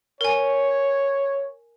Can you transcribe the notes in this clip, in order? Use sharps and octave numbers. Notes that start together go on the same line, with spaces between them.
A#4 C#5 G#5